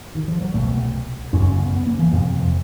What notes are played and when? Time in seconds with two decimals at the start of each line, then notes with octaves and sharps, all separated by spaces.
0.15 D#3
0.28 F3
0.41 F#3
0.54 C2 B2 A3
1.33 F#2 C#3 C#4
1.47 C#4
1.60 B3
1.72 B3
1.86 A#3
1.99 E3
2.12 F2 C3 F3
2.25 F#3
2.38 F3